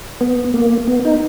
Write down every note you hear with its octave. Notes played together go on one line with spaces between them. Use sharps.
B3
A#3
B3
D#4